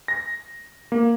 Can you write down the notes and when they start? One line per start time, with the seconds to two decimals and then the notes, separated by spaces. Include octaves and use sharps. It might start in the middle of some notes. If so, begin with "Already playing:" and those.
0.08 A#6
0.92 A#3